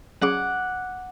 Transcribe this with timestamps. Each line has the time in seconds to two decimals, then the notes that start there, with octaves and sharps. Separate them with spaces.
0.22 F#3 C#4 G#4 F#5 D6